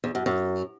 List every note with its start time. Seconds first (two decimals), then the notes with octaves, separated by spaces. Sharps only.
0.04 E2
0.15 F#2
0.26 F#2